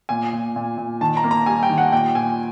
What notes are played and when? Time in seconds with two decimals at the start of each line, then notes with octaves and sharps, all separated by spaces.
0.09 A#2 G#5
0.33 A#2
0.56 A#2
0.78 A#2
1.01 D#3 A5
1.17 A#5
1.24 A#3
1.31 A#5
1.46 G3 G#5
1.63 G5
1.70 D#3
1.78 F#5
1.93 A#2 G5
2.15 A#2 G#5